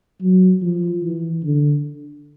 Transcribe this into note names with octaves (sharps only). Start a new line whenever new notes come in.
F#3
F3
E3
D3